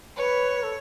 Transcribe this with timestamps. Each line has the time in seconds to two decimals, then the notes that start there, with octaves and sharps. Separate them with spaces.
0.16 B4 C#5
0.63 A4